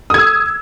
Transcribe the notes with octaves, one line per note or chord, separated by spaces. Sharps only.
D#6 E6 G#6